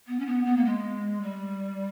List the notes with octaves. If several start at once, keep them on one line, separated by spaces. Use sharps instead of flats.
B3
C#4
B3
B3
A#3
G#3
G3